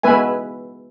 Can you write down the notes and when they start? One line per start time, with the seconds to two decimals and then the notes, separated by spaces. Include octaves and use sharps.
0.03 G#3 B3 B4 E5 G#5